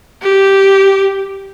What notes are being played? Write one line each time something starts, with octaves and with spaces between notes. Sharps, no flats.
G4